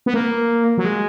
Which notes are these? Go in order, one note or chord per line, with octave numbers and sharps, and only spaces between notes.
B3
A#3
F#3
G#3